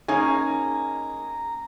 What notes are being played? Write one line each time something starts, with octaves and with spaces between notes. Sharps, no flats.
A#3 C#4 D#4 G#4 G#5 A#5